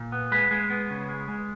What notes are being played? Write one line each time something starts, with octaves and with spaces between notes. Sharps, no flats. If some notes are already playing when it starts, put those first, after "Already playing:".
Already playing: A#2
B3
G#3 B4
G#3
B3
C#3
G#3
G#3